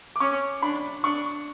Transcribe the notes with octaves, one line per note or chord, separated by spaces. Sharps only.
D6
C#4 C#6
D4 B5
D4 C#6